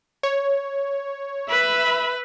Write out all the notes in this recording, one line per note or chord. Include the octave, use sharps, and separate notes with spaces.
C#5
B4 E5 B5